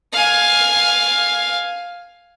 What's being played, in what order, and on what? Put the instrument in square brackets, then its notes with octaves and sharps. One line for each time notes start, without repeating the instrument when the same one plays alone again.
[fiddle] F5 G#5